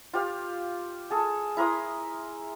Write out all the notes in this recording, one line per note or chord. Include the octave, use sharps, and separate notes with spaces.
F4 G4 F5
G#4 A4
E4 A#4 C6 D#6